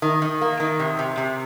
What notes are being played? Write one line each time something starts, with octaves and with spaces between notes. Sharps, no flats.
D#3
D#3
A#3
D#3
C3
C3
C3